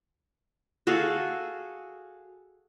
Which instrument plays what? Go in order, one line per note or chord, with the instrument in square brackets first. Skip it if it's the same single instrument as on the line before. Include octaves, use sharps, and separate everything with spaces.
[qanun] F#4 G#4 A4 F5